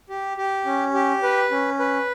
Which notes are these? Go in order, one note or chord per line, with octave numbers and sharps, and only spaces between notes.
G4
G4
C#4
G4
B4
C#4
B4